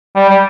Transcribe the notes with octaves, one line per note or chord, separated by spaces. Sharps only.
G3
G3